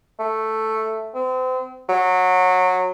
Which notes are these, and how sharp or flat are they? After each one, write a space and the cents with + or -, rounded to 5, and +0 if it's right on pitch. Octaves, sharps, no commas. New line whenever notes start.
A3 +0
C4 -35
F#3 -15